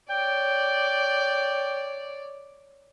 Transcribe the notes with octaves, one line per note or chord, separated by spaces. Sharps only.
C#5 D5 G5